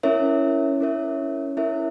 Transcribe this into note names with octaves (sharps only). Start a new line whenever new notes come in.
C#4 E4 A#4 C#5 E5
C#4 E4 A#4 C#5 E5
C#4 E4 A#4 C#5 E5